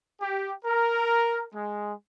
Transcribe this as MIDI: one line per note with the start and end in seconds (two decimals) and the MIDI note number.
0.21 0.53 67
0.65 1.44 70
1.54 1.92 56